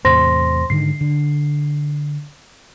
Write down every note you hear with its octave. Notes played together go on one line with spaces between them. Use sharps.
E2 A2 C3 C5 C6 A#6
G#2 D3 D#3 C7
D3